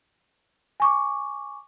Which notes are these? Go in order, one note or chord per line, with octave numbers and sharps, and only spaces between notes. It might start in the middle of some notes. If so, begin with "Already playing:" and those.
G#5 C#6 D6